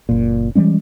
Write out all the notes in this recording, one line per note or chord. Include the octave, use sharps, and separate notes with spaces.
F#1 A#2
E3 G3 G#3 C#4